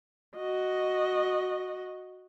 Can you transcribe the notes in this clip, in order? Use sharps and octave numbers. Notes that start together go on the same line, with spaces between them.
F#4 D#5